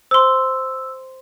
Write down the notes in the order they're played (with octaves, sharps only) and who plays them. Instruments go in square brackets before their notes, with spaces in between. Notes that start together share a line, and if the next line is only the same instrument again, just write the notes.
[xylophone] C5 C6 [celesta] E6